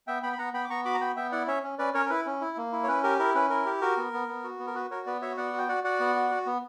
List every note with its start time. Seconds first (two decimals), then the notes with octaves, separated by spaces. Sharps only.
0.07 B3 E5 G5
0.23 B3 G5 B5
0.33 B5
0.38 B3 F#5 A#5
0.54 B3 G5 B5
0.64 D6
0.70 B3 A#5 C#6
0.85 F#4 B5 D6
0.94 A#5
1.01 B3 G5 B5
1.16 B3 E5 G5
1.32 E4 D5 F#5
1.48 C#4 C#5 E5
1.63 C#4
1.79 C#4 B4 D5
1.94 C#4 A#4 C#5
2.06 A#4
2.10 E4 B4
2.26 C#4
2.41 E4
2.57 A#3
2.72 E4
2.84 C#5
2.88 C#4 B4
3.03 G4 A#4
3.19 E4 A#4
3.35 C#4 B4
3.50 E4 A#4
3.66 G4
3.81 F#4 A#4
3.97 B3
4.13 B3
4.28 B3
4.44 F#4
4.60 B3
4.67 A#4
4.75 F#4 B4
4.91 F#4 A#4 C#5
5.06 B3 B4 D5
5.22 F#4 C#5 E5
5.37 B3 D5 F#5
5.53 F#4
5.58 G5
5.68 F#4 D5 F#5
5.84 F#4 D5 F#5
6.00 B3
6.15 F#4
6.31 F#4
6.46 B3